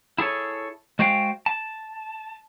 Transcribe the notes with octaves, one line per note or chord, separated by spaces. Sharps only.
E4 G#4 A4 C#5
G#3 F#4 C5 F5 G5
A5